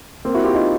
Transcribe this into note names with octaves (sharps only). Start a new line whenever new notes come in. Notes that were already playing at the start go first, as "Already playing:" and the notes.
A#3 C4
E4 F#4
F4 G4
D#4 F4